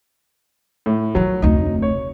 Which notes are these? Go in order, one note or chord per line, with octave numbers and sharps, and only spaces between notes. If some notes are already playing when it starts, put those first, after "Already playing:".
A2
D#3 F3 F#3
F1 D2 D#4
C#5